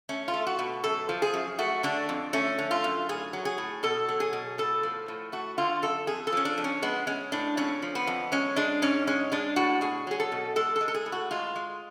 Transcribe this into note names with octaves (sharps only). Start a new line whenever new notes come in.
A3 C#4
F4
A3
F#4
B2
F#2 A4
F3
G#4
F#2
A3 F#4
D3 D4
F2
A3 C#4
D3
F4
F#2
A2 G#4
F#3
G#4
A2
B2 A4
F#3
G#4
B2
A2 A4
F3
A2
A3 F#4
D3 F4
F#2 A4
F2 G#4
A4
F3 C#4
D4
F2
C#4
G#3 B3
G#3 C#4
A2 D4
F2 C#4
F3
B3
F2
G#3 C#4
G#3 D4
G#2 C#4
G#3 C#4
G#3 D4
A2 F#4
B2 G#4
F#3 G#4
A4
B2
G#3 A4
A4
G#3
A4
G#4
A2
F#4
G#3 F4
G#3